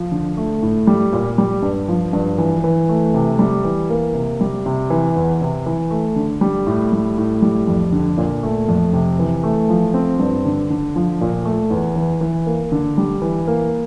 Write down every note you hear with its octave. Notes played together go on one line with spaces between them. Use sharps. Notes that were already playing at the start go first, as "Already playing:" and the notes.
Already playing: F3
D3
A3
A2
G3
A#2
G3
G2
F3
G2
E3
E3
A3
C3
G3
E3
A#3
C3
G3
C3
E3
E2
C3
E3
A3
D3
G3
A2
G3
A2
G3
F2
D3
A#2
A3
F2
C3
E3
A3
F3
C4
G2
D3
D3
F3
A#2
A3
E2
E3
E3
A#3
D3
G3
E3
A#3